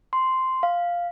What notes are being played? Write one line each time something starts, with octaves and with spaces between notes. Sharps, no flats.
C6
F5